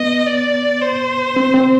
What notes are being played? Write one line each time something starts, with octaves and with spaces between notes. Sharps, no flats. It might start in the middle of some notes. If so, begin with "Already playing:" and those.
Already playing: B3 D#5
D5
C5
C4
C4